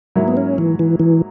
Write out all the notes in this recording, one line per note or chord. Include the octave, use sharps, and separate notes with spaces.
G#2 F#3 A#3 E4
B3
C#4
E3
E3
E3